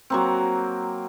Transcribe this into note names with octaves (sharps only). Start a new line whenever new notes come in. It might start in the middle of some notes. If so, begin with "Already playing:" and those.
F#3 A#3 C4